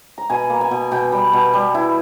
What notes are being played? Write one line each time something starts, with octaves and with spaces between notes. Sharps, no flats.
A#5
B2 G#5
A#3
G#5
B2
B2 G5
G3
B2
G3
E4